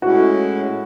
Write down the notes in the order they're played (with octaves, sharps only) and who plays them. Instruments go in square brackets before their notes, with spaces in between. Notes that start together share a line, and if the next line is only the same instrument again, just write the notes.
[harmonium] A2 G#3 C#4 E4 [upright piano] F#4